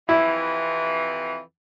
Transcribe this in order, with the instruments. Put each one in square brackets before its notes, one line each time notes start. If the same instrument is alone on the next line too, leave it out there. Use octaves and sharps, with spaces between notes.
[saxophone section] F2 C3 E3 [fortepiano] E4